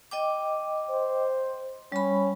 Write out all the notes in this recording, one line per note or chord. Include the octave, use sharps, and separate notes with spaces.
D#5 G5 D6
C5
G3 C#4 B5